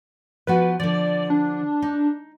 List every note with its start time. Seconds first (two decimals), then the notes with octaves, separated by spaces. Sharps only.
0.47 F3 B3 F#4 B4
0.80 D3 F3 D5
1.30 D4
1.82 D#4